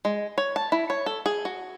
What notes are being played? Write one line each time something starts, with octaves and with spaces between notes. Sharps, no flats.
G#3
C#5
A5
E4
C#5
A4
G#4
F#4